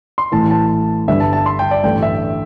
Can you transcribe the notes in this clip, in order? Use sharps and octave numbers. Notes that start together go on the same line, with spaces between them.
C6
A1 A2 E3 A5
A5
G1 G2 D3 G3 E5
A5
A5
C6
G5
D5
A1 G2 D3 A3 G5
E5